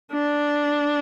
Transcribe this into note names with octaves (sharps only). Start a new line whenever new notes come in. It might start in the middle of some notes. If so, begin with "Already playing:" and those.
D4